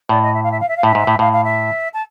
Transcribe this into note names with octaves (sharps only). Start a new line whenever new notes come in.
A2 D5
D#5
E5
F5
E5
F5
E5
F5
A2 E5
G#2
A2
A2 F5
F5
E5
A5